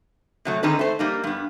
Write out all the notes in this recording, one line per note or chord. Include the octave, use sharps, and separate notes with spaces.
C3 F#3 A3
D3 D#3 C4 D#4 G#4 B4
A3 C5
G3 A#3 D#4
G2 B3